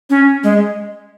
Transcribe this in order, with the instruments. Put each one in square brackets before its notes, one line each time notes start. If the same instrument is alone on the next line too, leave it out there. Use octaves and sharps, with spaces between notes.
[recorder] C#4
G#3